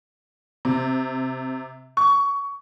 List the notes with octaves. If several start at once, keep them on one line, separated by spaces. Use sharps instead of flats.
C3
C#6